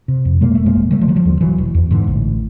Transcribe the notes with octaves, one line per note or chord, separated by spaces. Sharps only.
C3
F2
B2 G#3 A#3
F1 A3
G#3 A#3
F1
D3 G3 A3
F3
D3 F#3
F3 G3
D#2
E1 E3 F#3
E1
E2
G#2 D3 E3
A1